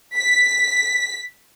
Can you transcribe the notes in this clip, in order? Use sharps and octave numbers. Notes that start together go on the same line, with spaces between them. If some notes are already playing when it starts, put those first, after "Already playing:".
B6